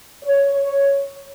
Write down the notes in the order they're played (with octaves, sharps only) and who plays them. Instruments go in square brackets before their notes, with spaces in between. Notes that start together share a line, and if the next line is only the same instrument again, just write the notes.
[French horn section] C#5